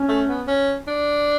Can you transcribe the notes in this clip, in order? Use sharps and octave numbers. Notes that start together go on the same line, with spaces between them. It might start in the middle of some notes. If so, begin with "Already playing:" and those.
Already playing: C#4
A3
B3
C#4
D4